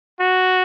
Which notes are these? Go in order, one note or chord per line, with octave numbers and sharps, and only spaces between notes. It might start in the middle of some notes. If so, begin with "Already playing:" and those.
F#4